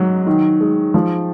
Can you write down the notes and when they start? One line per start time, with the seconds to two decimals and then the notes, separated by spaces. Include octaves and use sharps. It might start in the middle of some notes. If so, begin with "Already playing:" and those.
Already playing: G#2 F#3
0.27 D#3
0.61 G#3
0.94 F3